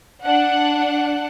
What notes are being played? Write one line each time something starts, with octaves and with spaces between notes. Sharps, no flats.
D4 F#5